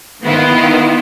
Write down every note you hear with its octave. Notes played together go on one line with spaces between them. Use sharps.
D#3 B3 E4 F4